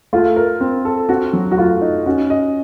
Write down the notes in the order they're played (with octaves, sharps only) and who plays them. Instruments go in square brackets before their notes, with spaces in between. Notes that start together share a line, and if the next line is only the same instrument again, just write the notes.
[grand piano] A3 [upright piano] F4
[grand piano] A#4
C4
A4
[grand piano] C4 [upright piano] F#4
[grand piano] F#3
[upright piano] F#4
[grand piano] A3 [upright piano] F4
[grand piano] D#4
[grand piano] C#4 [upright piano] F#4
[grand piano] D#5